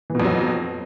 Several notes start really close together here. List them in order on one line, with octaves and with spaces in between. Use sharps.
E3 B2 F2 F#3